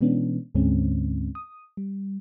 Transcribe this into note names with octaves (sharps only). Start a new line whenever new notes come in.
B2 E3 G#3 B3 C#4 D4
D2 G#2 D3 G#3 C4 C#4
D#6
G3